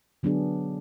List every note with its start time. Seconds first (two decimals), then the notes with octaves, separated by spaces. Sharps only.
0.23 D3 F#3 B3 D4 G#4